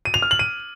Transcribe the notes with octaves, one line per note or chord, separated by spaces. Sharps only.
D#7
F7
F6
F#7
D#7